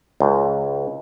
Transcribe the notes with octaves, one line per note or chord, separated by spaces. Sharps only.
C#2